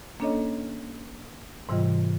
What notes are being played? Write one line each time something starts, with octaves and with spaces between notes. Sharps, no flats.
A#3 C#4 D4 A4 C#5 D#5
G#2 C3 E3 G3 F4 D#5